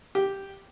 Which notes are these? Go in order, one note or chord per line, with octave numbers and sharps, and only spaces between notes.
G4